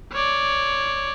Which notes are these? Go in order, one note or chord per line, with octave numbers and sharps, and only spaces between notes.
C#5 D5